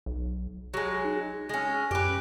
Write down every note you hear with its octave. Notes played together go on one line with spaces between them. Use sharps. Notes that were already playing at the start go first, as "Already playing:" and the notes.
B1
F#3 G#3 G4
D#4
G#3 C#4
F#2 G4 B4